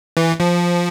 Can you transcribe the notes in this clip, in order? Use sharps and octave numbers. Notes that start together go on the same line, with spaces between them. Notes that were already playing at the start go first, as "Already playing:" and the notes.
E3
F3